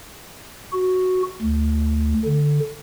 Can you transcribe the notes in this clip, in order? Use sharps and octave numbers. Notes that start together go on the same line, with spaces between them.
F#4
D2
D3